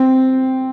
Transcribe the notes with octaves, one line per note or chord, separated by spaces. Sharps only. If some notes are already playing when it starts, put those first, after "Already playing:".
Already playing: C4